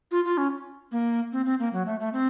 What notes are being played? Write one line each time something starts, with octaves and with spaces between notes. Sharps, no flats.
F4
F4
C#4
A#3
C4
C4
A#3
F#3
A3
A3
C4